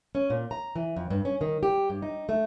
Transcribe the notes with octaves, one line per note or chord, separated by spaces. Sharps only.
C#4
A#2
A#5
E3
F2
G2
C#4
D#3
G4
G2
D#4
A3